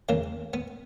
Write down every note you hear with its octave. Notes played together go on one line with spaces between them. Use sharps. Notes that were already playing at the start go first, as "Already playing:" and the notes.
E2 C#3 E3 A#3
B3